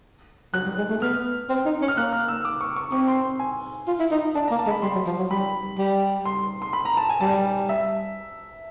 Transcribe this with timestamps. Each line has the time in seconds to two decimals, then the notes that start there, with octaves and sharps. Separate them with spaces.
0.54 F#3 F#6
0.66 G3
0.78 G#3
0.90 A3
1.02 B3 F6
1.50 C4
1.65 D#4
1.82 C#4
1.88 F6
1.97 A#3 F#6
2.12 F6
2.28 E6
2.45 D6
2.61 C#6
2.76 C#6
2.92 C4 C#6
3.08 C6
3.39 G#5
3.88 F4
4.00 E4
4.11 D#4
4.35 D4 A5
4.48 A#5
4.51 A#3
4.59 A5
4.67 G#3
4.70 B5
4.82 G3 C6
4.95 F#3
5.06 F3
5.18 F#3
5.31 G3 B5
5.78 G3
6.25 C6
6.62 C6
6.73 B5
6.85 A#5
6.97 A5
7.09 G#5
7.21 G3 A5
7.69 E5